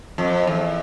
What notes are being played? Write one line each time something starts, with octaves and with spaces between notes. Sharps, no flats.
F2
E2